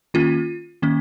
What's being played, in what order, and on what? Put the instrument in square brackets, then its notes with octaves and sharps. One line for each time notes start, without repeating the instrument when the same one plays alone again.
[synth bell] D#3 A#3 C#4 F4
D#3 A#3 C#4